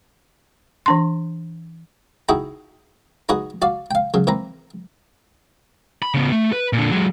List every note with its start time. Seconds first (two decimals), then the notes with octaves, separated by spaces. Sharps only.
0.86 E3 D4 C6
2.29 D#4 E4 F#4 G#4 G5
3.29 D#4 F#4 G#4 B4 D#5 F#5
3.62 F#4 D5 F5
3.91 F5 G5
4.14 C#3 F#3
4.27 E3 C4 B4 A#5
6.02 B5
6.14 C#3 B3
6.32 A3
6.52 B4
6.73 A#2 D3
6.91 F#3 G#3